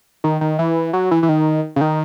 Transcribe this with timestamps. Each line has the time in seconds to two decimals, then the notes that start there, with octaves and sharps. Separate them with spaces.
0.24 D#3
0.41 D#3
0.59 E3
0.93 F#3
1.11 E3
1.23 E3
1.29 D#3
1.76 C#3
1.81 D#3